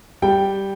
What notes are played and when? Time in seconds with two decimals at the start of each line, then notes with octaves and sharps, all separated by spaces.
0.22 G3 G5